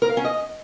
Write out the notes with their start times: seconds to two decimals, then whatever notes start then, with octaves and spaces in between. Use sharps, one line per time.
0.02 A#4
0.09 F5
0.17 C#4
0.25 D#5